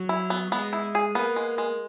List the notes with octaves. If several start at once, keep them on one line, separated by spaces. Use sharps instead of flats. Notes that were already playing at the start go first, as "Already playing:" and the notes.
Already playing: F#3
E4
B3
G#3 B3
E4
G#4
A#3 B3
G#3
G#3